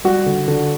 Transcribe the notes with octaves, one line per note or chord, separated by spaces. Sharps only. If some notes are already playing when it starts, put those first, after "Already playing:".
G3 F#4
D3
D3